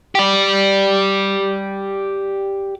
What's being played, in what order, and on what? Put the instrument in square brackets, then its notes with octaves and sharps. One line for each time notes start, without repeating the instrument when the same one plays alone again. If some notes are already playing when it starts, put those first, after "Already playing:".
[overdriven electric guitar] G4 D5